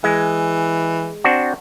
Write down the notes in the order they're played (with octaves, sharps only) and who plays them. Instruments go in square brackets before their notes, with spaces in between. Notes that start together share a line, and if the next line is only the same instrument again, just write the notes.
[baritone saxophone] E3 [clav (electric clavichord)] G#3
[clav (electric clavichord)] C4 D4 F#4